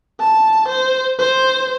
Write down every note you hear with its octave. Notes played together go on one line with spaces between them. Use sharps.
A5
C5
C5